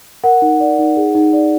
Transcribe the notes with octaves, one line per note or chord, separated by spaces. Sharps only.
A#4 F#5
D#4
D5
D#4
G#4
D#4
D5